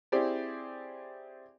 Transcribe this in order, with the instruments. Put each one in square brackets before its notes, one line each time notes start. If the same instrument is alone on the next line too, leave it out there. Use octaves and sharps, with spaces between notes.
[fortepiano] C4 E4 G4 G#4 C5 D5